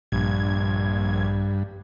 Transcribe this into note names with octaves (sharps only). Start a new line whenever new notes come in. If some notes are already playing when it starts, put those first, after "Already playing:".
A#1 G2 G#6